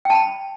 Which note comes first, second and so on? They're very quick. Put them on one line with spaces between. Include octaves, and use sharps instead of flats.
G5 A5 B5